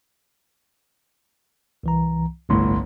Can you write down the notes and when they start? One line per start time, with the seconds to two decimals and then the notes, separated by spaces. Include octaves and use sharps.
1.83 C2 E3 A#5
2.50 G1 C2 A2 C6